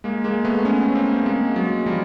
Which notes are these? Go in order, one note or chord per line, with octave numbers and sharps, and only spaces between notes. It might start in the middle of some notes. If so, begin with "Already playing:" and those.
G#3 A#3
G#3 A#3
A3 B3
B3 C#4
A#3 C4
G#3 A#3
F#3 G#3
F3 G3